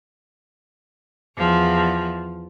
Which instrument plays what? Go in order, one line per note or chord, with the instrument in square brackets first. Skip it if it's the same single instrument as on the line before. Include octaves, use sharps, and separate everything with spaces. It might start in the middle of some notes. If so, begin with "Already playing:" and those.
[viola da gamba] E2 F3